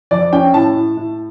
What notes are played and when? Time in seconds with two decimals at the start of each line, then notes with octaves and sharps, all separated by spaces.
0.11 F2 D5
0.33 C#4 G5
0.54 A2 A5
0.75 A2
0.97 A2